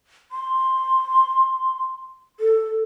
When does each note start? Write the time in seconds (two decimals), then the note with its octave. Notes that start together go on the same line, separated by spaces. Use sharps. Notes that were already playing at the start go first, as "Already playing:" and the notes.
0.32 C6
2.40 A4